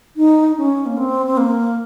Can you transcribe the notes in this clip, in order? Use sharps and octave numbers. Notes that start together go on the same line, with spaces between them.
D#4
C#4
A#3
C4
C4
A#3